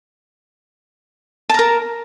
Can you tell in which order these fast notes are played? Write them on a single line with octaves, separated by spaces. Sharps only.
A5 A#5 A#4